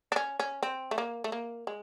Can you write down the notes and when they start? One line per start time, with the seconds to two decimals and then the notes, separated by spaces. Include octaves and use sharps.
0.12 D4
0.16 C#4
0.40 C#4
0.63 C4
0.91 A3
0.98 A#3
1.24 A3
1.32 A#3
1.67 G#3